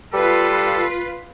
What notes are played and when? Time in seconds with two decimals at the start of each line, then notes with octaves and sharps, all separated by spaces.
0.13 G3 F4 A4 B4